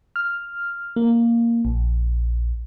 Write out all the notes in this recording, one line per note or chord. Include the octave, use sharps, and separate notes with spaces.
F6
A#3
A#1